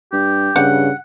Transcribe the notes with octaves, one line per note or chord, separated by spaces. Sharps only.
G2 G4
G2 C#3 F#5